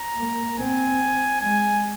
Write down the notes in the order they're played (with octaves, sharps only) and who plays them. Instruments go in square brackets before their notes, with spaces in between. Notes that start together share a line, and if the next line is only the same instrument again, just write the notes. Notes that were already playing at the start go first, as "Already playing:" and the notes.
Already playing: [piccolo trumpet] A#5
[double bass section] A#3
[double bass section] C4 [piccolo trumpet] G#5
[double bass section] G#3 [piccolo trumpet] G#5